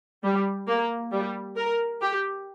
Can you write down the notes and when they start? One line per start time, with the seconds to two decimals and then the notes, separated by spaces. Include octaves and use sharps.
0.23 G3
0.67 A#3
1.12 G3
1.56 A#4
2.01 G4